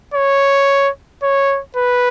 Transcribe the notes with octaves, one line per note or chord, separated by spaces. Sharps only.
C#5
C#5
B4